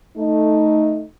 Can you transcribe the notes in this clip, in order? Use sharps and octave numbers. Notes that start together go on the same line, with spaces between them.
A3 D#4